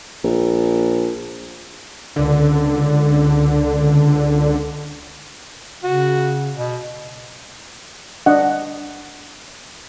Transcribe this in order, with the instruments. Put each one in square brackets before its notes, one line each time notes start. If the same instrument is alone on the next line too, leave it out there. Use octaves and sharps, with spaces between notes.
[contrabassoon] A#1
[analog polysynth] C#2 D3
[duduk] C#3 [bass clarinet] F#4
[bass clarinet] B2
[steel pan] D4 D#5 F#5